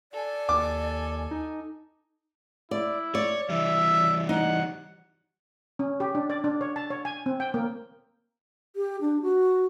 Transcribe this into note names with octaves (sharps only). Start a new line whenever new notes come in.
A4 D5 G#5
D#2 D6
D#4
E4 D5
C#5 D5
E3 G3 E5
D#4 F#5
C#4
G4
D4
D5
D4
C#5
A5
C#5
G#5
C4
G5
A#3
G4
D4
F#4